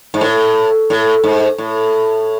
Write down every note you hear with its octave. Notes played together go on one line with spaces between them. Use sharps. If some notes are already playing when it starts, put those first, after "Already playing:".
G#2
A2
A2
G#2
A2